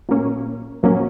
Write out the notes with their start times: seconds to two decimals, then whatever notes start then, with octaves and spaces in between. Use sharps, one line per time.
0.09 A#2 F#3 A#3 C#4
0.83 A#2 F#3 A#3 C#4